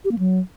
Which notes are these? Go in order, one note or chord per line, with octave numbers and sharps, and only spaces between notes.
G4
A#3
F#3